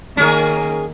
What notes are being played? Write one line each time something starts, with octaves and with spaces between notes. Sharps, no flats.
D#3 A#3 C#4 G#4 A#4